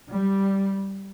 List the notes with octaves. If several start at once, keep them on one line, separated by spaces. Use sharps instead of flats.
G3